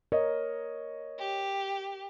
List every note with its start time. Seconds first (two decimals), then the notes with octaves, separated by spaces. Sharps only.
0.12 A#4 C#5 D#5
1.19 G4